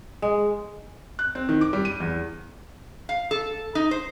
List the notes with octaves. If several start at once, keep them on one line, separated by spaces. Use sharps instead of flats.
G#3
F#6
C4
D#3
D6
G3
D#7
E2
F5
A4
D#4
C5